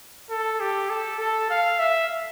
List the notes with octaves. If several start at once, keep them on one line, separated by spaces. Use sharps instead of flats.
A4
G4
A4
A4
F5
E5